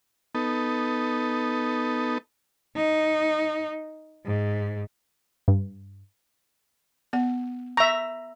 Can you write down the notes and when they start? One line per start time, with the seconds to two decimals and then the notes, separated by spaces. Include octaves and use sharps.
0.35 B3 D#4 A4
2.76 D#4
4.25 G#2
5.48 G2
7.13 B3 F#5
7.77 E5 A#5 C#6